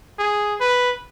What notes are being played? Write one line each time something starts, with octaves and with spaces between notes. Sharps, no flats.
G#4
B4